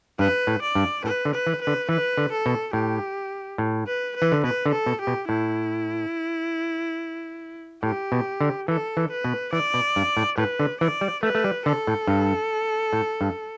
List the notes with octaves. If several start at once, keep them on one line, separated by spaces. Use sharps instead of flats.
G2 B4
A2
D5
G2
A2 B4
D3
B4
E3
B4
D3
E3 B4
D3
A4
B2
A2 G4
A2
B4
B4
E3
D3
B2 B4
D3
A4
B2
G4
B2
A2 E4
A2 G4
B2
D3
E3 A4
E3
B4
B2
E3 D5
B2
G2
A2
A2 B4
D3
E3 D5
G3
A3 B4
A3
G3
D3 A4
A2
G2
A2
G2